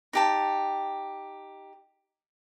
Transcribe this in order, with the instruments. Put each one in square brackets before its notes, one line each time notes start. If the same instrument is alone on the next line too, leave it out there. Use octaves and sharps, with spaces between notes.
[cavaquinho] D#4 G4 A5